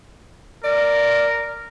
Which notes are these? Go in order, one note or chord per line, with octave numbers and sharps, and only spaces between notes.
A#4 D5